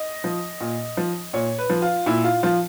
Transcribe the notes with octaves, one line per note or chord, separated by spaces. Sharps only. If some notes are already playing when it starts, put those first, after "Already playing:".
Already playing: D#5
F3
A#2
F3
A#2 C#5
B4
F3
F4
A#2 E4
F4
F3 F4